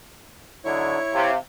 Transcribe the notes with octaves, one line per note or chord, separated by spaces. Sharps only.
D3 F#3 D#4 E4 C#5
C3 F5